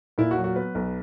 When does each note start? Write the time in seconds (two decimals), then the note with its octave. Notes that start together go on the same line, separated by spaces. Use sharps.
0.18 A#2 E4
0.31 F#4
0.37 F#3
0.44 F#4
0.56 B3 B4
0.75 B1